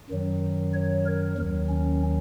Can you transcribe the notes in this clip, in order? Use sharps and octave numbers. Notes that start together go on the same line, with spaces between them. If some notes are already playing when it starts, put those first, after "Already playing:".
F#2 D#3 F#3
C#5
A#4
D#2 D#3 F#3
C#4